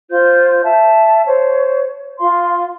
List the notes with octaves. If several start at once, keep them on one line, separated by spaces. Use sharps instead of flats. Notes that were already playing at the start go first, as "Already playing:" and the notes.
F4 C5 G6
E5 A5
C5 C#5
F4 F5 C6